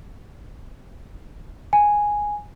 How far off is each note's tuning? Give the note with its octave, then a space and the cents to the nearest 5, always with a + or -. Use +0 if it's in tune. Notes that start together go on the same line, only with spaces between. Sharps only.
G#5 -5